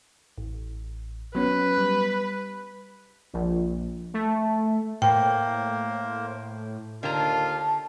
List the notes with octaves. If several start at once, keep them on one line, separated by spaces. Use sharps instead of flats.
A1
F#3 B3 C#4 B4
G3 F#6
A#1
A3
A2 A#3 A#4 C5 G5
D#2 D3 F4 A5 A#5